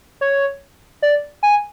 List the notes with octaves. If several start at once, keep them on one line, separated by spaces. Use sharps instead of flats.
C#5
D5
G#5